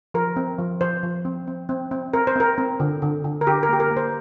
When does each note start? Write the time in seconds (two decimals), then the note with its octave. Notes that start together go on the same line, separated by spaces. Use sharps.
0.14 F3 A#4
0.36 C4
0.59 F3
0.81 F3 C5
1.03 F3
1.25 C4
1.47 C4
1.69 C4
1.91 C4
2.14 C4 A#4
2.27 C5
2.36 C4 A#4
2.58 C4
2.80 D3
3.02 D3
3.24 D3
3.41 A#4
3.47 D3 G4
3.63 A#4
3.69 A#3 G4
3.80 A#4
3.91 A#3
3.97 C5